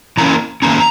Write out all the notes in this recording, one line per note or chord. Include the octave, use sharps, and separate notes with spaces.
E3 A#3 C#4 A#5
D#3 A#3 C#4 A#5